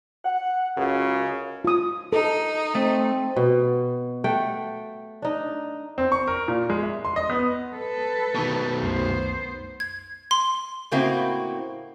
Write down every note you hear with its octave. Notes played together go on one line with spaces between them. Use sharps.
F#5
C#2 F#2 C#3
F4 D#6
D#4 A4
A3 C4
B2
A3 F#5 G5
D4 D#4
C4
C#6
A#4
A#2
G#3
E5
C6
D#5
B3
A4 B4
B2 D#3
C2 F#2 A3 B3 C5
G#6
C6
A2 C#3 A#3 C4 E4 F#4